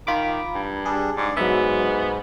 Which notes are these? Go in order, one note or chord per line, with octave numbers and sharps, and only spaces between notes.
D#3 F4 B5 D6
G2
G3 D4 G#4
G#2 D5
G#2 F#3 B3 E5